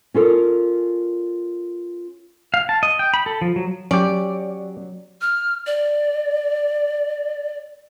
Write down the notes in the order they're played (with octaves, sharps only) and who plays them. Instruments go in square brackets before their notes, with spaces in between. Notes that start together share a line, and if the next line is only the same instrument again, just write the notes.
[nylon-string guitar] C#4 F4 A4 A#4
[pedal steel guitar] F5
A5
D#5
G5
B5
A4
F3
F#3
[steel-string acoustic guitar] F#3 [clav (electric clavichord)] C#4 G4 [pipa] D5
[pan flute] F6
D5